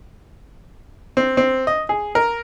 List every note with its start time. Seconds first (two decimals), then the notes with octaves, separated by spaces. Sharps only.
1.17 C4
1.37 C4
1.67 D#5
1.89 G#4
2.15 A#4